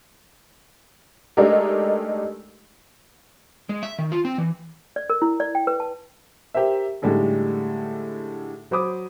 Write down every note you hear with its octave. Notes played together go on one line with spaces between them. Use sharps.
G#3 A3 D4 D#4 G4 A#4
G#3
E5
D#3
F4
C4
E3
D5
A#4
E4
D5
G5
B4
A5
G4 A#4 C5 E5
A2 D3 G3 G#3 D#4
F#3 C5 B5 D6 D#6